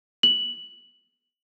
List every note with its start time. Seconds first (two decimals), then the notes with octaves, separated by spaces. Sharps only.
0.23 F#7